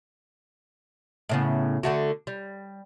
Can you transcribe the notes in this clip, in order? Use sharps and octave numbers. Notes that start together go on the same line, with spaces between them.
A2 C#3 B3
D3 A3 F#4
G3